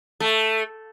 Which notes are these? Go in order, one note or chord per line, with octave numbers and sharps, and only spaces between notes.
A3